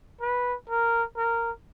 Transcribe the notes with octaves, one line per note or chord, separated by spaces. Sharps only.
B4
A#4
A#4